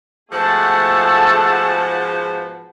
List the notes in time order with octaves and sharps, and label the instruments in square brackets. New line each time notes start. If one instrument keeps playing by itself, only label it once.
[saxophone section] G#2 B2 F3 [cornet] A3 [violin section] G#4 F#5 A5